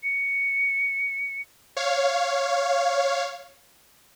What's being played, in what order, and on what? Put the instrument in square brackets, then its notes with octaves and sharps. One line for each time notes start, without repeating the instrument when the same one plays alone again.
[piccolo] C#7
[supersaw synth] C#5 F5